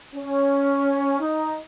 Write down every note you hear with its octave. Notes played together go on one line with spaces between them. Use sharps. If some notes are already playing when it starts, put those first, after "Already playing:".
C#4
D#4